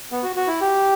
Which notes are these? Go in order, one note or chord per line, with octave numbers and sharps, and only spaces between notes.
B3
F#4
F#4
E4
G4